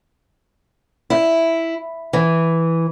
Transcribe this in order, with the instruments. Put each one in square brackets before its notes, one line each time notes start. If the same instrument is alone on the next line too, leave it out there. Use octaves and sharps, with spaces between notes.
[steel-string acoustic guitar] E4
E3